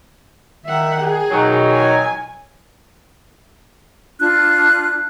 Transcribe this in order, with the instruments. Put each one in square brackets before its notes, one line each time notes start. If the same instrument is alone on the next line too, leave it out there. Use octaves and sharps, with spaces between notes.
[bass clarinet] D#3 [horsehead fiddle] E5 F#5
[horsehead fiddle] G#4
[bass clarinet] B2 [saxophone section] D#3 F#3
[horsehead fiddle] G#5
[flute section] D4 F4 F#6